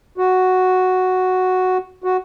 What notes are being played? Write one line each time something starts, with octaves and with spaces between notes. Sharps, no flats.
F#4
F#4